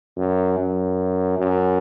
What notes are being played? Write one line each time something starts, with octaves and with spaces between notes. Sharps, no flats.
F#2
F#2
F#2